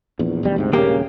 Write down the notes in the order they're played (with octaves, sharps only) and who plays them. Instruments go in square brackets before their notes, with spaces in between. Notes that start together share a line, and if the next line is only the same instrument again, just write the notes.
[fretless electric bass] A#1 E2
F1 E2 G3
D2 G#2 C3
[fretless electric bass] D#1 C#3 [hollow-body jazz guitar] A#3 G4